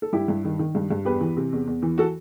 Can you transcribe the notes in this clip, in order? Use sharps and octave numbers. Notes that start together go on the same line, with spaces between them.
A4
G2 E4 G4
G2
D#3
D#3
G2
G2
E2 G4 B4
E3
C3
E2
E2
E3
F#4 A4